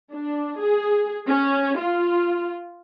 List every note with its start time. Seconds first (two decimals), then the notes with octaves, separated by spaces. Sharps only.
0.13 D4
0.59 G#4
1.28 C#4
1.78 F4